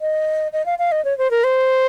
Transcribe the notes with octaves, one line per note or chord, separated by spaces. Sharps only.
D#5
D#5
F5
F5
D#5
C#5
C5
A#4
C5